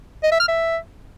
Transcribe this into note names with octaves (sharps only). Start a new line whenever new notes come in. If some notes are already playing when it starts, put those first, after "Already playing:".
D#5
E5
F6
E5